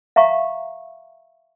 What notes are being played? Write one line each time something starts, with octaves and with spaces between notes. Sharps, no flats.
E5 F5 A#5 C#6